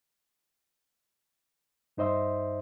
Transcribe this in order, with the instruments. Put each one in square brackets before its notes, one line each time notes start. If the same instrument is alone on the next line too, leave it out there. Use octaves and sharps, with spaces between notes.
[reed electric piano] G2 D#4 C5 D#5 E5 C6